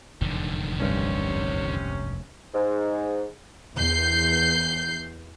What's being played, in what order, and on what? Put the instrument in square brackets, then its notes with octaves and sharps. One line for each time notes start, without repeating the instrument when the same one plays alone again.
[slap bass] F1 E2 G#2 [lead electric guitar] D3 D#3
[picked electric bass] C2 G2 [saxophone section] C3 C#4
[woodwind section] G#2
[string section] E2 G6 C7